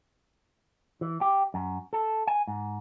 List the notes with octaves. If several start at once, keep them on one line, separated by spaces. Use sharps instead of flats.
E3
G4
F#2
A4
G#5
G#2